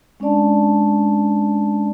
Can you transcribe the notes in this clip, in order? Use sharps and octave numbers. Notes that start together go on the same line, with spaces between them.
G#3 C#4 D4 D5 A5